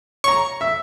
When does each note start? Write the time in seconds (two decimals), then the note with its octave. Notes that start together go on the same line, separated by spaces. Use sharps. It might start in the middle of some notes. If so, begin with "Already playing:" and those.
0.24 C#5 A#5 C#6
0.61 E5